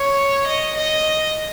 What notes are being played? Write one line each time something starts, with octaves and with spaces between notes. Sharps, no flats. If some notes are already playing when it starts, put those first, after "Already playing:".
Already playing: C#5
D#5
D#5